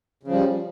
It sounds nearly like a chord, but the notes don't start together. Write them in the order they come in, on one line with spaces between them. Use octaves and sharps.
C#3 F3 G3